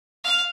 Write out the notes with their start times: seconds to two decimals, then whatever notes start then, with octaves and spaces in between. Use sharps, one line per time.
0.24 F5